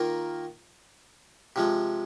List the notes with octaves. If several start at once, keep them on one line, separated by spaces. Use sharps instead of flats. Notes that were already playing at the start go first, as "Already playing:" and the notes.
Already playing: D#3 A#3 F4 A#4
C3 F3 G#3